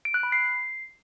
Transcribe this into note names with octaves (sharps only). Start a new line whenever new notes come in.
D7
F#6
B5
C7